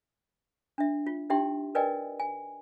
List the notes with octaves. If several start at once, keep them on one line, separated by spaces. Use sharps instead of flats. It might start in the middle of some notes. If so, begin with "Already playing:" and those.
D4 E5
F4
D4 D#4 G4 E5 G5 C6
A#4 B4 D5 D#5 G5 G#5
G#5